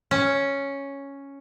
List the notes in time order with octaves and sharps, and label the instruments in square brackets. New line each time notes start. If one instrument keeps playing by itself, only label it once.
[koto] C#4